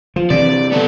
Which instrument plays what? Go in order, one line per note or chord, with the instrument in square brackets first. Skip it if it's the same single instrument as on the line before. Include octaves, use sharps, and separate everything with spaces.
[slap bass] F3
[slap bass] C3 E3 [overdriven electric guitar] D5
[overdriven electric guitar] B3 A4